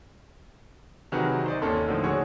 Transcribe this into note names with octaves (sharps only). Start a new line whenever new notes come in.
C3 D#3 F#3 F#4 G#4 B4
C5 D5 D#5
D#2 A#3 C#4 A4 C6
A2 D3 D#3 F3
F#4 G#4 C#5